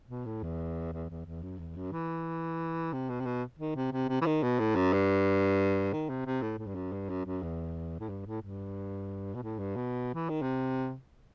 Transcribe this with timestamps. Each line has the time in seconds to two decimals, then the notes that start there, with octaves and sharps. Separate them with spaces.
0.09 B2
0.26 A2
0.43 E2
0.93 E2
1.10 E2
1.26 E2
1.43 F#2
1.59 E2
1.76 F#2
1.92 E3
2.93 C3
3.09 B2
3.20 C3
3.26 B2
3.59 D#3
3.76 C3
3.92 C3
4.08 C3
4.21 E3
4.26 D#3
4.43 B2
4.59 A2
4.75 F#2
4.93 G2
5.93 D#3
6.10 C3
6.26 C3
6.42 A2
6.58 A2
6.67 G2
6.75 F#2
6.92 G2
7.09 F#2
7.25 F#2
7.43 E2
8.00 A2
8.09 G2
8.26 A2
8.42 G2
9.34 B2
9.43 A2
9.59 G2
9.76 B2
10.14 E3
10.29 D#3
10.42 C3